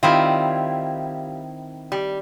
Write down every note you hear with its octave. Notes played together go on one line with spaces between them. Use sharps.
D#3 G3 C4 E4 F4
G3